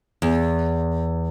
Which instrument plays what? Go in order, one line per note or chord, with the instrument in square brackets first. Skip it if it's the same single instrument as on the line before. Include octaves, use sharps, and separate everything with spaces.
[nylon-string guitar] E2